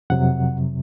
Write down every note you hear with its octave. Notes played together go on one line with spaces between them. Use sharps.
F2 C3 F#3 F#5